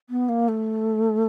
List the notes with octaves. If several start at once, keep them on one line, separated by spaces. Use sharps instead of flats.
B3
A#3
A3